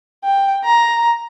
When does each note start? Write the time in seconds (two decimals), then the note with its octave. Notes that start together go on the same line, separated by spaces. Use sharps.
0.24 G5
0.64 A#5